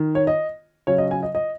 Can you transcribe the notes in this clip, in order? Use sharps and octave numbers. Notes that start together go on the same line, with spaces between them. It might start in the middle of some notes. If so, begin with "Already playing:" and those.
Already playing: D#3
C#5
D#5
C#3 F#3 C#4 C#5
D#5
G#5
D#5
D#5